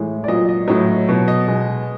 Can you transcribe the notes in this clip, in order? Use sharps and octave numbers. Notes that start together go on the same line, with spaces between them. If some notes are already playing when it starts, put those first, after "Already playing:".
Already playing: A2 E3 G#3
D5
A#2 F#3 D#5
D#5
A2 F#3 D#5
B2 F#3
D#5
B2 G#3